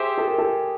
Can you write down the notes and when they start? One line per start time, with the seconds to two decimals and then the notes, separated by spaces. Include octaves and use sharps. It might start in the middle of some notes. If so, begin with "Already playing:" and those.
Already playing: G4 G#4 C5 E5
0.18 A4
0.28 A#4
0.38 A4